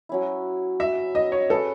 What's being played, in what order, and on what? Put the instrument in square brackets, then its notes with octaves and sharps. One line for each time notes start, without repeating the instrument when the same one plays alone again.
[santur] F#3 C#4 E4
[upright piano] E5
D#5
C#5
[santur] C#4 G#4 B4 [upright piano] A4